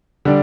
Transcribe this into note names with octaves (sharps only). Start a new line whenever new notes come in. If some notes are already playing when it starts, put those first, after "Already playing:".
D3 G3 D4